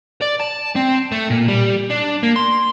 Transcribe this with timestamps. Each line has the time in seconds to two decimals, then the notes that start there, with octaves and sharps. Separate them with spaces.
0.22 D5
0.41 A5
0.76 C4
1.12 A3
1.30 A#2
1.48 G3
1.91 D4
2.23 A#3
2.36 C6